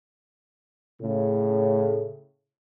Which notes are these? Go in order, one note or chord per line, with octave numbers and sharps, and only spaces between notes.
A2 C#3